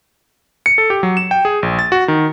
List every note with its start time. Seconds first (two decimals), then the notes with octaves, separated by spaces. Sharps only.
0.66 C#7
0.78 A4
0.90 G4
1.03 F#3
1.17 E7
1.31 G5
1.45 G#4
1.63 A#1
1.79 A6
1.92 F#4
2.08 D#3